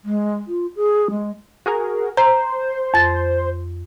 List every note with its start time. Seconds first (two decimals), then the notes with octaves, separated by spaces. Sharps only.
0.04 G#3
0.47 F4
0.76 G#4
1.10 G#3
1.66 F#4 G#4 A#4
2.17 C5 A#5
2.94 F2 A6